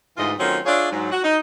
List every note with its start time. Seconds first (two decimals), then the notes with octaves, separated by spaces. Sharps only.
0.17 D2 G#2 E3 F4 D#5
0.38 D#3 F#3 A3 C4 C#4 F4
0.65 D4 F4 G#4 C#5 D5 E5
0.91 G#2 F#3
1.11 F#4
1.23 D#4